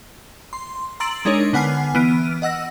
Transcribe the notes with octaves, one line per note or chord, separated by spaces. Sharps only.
C6
A#5 C6 E6 A6 D7 F#7
G#3 D4 D#4 A#4 C#5
D3 B3 F#5 G#5 F6 C7
E3 B3 F6 D7 D#7
D#5 F#5 E6 A#6